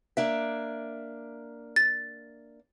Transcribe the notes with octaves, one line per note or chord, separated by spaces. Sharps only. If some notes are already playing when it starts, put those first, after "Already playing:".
A#3 D4 E5
A6